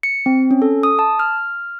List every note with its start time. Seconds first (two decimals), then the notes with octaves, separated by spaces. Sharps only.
0.03 C#7
0.26 C4
0.51 C#4
0.62 A4
0.83 D#6
0.99 A5
1.19 F6